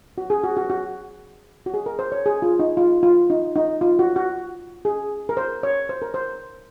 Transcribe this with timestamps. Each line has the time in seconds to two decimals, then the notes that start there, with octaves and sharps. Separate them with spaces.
0.18 F#4
0.30 G#4
0.43 F#4
0.57 F#4
0.70 F#4
1.66 F#4
1.74 G#4
1.86 A#4
1.99 C5
2.12 C#5
2.26 G#4
2.42 F4
2.59 D#4
2.77 F4
3.03 F4
3.30 D#4
3.56 D#4
3.81 F4
3.99 F#4
4.16 F#4
4.85 G#4
5.29 A#4
5.37 C5
5.63 C#5
5.89 C5
6.02 A#4
6.14 C5